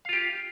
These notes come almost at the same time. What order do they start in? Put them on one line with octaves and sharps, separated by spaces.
F5 F4 G4